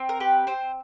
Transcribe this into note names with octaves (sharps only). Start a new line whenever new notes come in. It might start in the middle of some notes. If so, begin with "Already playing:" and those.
Already playing: C4
A#4
G4 B4
C4 C5